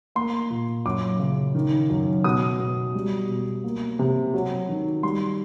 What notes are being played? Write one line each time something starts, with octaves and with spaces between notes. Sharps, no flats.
A#3 C6
A#2
F#2 D6
C#3
D#3
F#2
B2 D#6
B2
G3
B2
A#3
C3
F#3
D#3
G3 C6